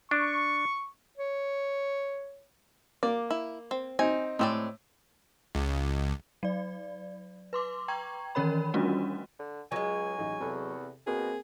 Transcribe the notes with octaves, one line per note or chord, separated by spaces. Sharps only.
D4 C#6
C#5
A#3 D5
E4
C4
C4 D#4 G#5
A2 G#3 C4 D5
C#2
F#3 D5
B4 C6 D6
G5 A#5 C#6 G#6
D#3 E3 C#4 A#4 C#5 B5
G3 A3 C#4 D4 F4 F#4
D3
C#2 F#3 G#3 G#5
A1 D#4
E2 C3 A4
B2 A#3 C4 G#4 A#4